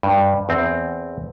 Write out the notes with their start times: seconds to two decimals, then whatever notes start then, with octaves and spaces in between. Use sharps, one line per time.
0.03 G2
0.49 E2 C4